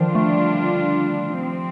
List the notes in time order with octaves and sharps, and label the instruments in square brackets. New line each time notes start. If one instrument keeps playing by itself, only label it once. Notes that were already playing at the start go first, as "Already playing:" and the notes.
Already playing: [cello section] D3 G3 D4 F4 [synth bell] D#3 F3
[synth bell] A3
[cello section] C3 F3 C4